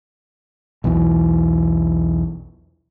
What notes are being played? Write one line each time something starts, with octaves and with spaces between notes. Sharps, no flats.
B1 E2 B2 E3